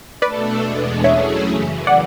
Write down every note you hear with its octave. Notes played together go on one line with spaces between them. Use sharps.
B2 A3 D4 A4 B4 D5
E2 B2 G#3 B3 D4
F#3 A3 C#4 E4 G#4 C#5 E5
F#2 C#3 E3
D5 F#5